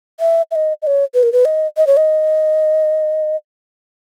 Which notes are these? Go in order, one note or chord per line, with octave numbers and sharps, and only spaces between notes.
E5
E5
D#5
D#5
C#5
B4
A#4
B4
D#5
D#5
C#5
D#5